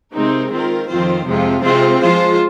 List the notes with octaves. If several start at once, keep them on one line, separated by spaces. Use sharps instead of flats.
C3 G#3 C4 D#4 A#4
D#3 C4 F4 A#4
F2 D#3 C4 F4 C5
F2 C3 F3 G#3 F4
C3 G#3 C4 F4 C5
F3 G#3 F4 C5